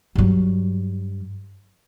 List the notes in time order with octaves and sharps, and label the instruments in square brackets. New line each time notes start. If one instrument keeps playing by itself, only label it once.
[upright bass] G2 F#3